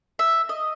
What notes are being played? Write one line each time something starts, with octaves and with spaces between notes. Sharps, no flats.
E5
D#5